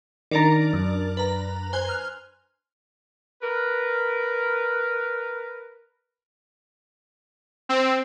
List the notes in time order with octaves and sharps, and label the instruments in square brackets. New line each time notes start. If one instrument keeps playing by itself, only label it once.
[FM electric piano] D#3 A#5 [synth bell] D4 A#4 D5
[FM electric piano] F#2
[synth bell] B4 A#5
C5 G#5 F#6
F6
[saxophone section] A#4 B4
[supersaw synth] C4